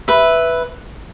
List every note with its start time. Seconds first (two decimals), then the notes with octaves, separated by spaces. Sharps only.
0.08 B4 E5